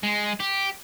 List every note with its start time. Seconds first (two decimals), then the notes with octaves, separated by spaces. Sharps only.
0.03 G#3
0.40 G4